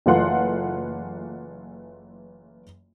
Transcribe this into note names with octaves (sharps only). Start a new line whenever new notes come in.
F#1 E3 A3 F4 F#5 C6